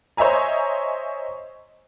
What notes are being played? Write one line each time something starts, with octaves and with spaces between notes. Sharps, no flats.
C5 C#5 D#5 E5 G#5 A#5